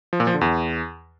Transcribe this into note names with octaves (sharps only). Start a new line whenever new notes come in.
F3
A#2
F3
D3
E2